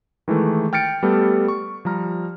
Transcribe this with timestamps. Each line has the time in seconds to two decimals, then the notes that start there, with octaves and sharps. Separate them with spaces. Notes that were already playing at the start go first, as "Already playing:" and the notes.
0.28 D#3 E3 G#3 A3
0.73 G5 F6 A6 C#7 D7
1.03 G3 A3 B3 G4 A4
1.48 C#6
1.85 F3 G3 A#5 F6